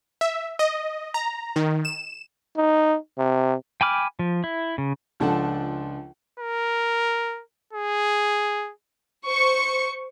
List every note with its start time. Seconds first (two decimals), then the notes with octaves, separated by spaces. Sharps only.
0.21 E5
0.59 D#5
1.14 A#5
1.56 D#3
1.85 E7
2.57 D#4
3.18 C3
3.81 G5 G#5 B5 D6 F6
4.19 F3
4.44 E4
4.78 C#3
5.20 C#2 F3 D4 A4 F#5 A5
6.40 A#4
7.73 G#4
9.25 C5 C#6 C#7